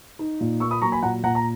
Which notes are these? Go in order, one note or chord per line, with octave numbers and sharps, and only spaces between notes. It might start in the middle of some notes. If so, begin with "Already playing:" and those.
D#4
A#2
A#3 C#6 E6
B5 D#6
F#3 A#5 C#6
G#5 B5
A#2 F#5 A#5
A#2 F#5 A#5
A#5